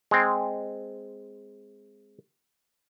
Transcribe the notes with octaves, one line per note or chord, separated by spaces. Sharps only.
G#3 C4